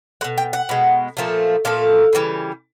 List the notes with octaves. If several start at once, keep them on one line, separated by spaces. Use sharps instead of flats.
G#3 F#5
B2
G5
F#5
B2 G#3
A#2 F3 A3
A#2 F3 A3 F5
C#3 E3 G3